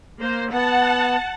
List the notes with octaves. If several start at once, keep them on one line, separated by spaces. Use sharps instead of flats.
A#3 C5
B3 F#5 A5